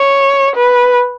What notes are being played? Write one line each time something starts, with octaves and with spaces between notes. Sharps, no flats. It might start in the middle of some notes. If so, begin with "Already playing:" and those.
Already playing: C#5
B4